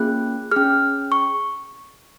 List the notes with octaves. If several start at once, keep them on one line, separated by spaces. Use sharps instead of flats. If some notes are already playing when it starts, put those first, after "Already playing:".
Already playing: A#3 C#4 F4 G#4 F#6
C#4 G#4 F6
C#6